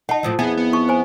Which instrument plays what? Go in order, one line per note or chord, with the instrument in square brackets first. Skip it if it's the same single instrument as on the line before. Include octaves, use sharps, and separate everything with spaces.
[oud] D#4 [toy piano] F#5 A5
[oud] A2 F3 F#3
[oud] F2 E4 G#4 [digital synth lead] B3
[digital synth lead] B3
[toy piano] D#4 C#6
C5 G#5